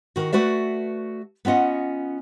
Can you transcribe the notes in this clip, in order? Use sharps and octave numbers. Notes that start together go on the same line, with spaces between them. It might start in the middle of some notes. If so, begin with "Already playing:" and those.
D#3 F#4
A3 F#4 B4 D5 E5
B3 C#4 F4 D#5 F#5